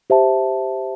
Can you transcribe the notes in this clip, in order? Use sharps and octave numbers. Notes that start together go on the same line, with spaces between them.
G4 C5 E5 A5